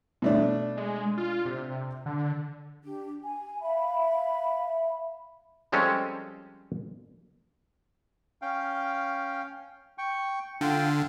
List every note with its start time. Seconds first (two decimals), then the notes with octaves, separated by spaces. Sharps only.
0.22 B2 A3 D4
0.77 G#3
1.17 F4
1.46 C3
2.06 D3
2.84 D4 G4
3.23 G#5
3.62 E5 F5 B5
5.72 F3 G3 G#3 C4 C#4 A4
8.42 C#4 F5 G5
9.98 G5 C#6
10.61 D3 F4 F5 G5